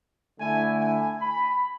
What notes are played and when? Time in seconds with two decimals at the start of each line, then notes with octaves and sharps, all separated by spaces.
0.40 D3 A3 E4 G#5
0.80 G#5
1.20 B5